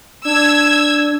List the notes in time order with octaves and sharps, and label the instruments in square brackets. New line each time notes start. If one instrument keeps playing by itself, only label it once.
[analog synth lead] D4 [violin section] E6 G#6